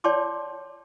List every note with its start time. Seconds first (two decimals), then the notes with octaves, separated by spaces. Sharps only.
0.04 C#5 D5 G5 A5 C6 D6